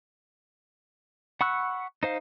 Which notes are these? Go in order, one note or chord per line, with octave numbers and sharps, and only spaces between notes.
F#5 B5 C#6 E6 F#6
D#4 C5 F5